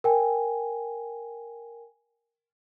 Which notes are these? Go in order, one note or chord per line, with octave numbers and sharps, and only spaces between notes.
A#4 G5 G#5